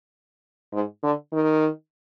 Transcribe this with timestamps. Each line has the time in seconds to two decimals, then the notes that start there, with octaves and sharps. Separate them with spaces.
0.73 G#2
1.03 D3
1.33 D#3